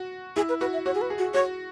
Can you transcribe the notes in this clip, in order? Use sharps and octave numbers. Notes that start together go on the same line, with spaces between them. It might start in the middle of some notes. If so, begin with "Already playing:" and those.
Already playing: F#4
E4 G#4
B4
F#4 B4
E5
F#4 C#5
G#4
B4
G#4
F#4
F#4 C#5